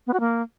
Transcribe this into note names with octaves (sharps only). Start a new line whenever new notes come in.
B3
F#4
A#3